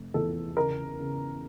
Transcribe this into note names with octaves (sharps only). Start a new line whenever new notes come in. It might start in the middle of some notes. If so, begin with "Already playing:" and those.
Already playing: F1
E2 A4
C#3 A#4
C#3